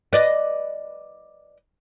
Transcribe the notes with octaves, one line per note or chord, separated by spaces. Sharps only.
B4 D5 D#5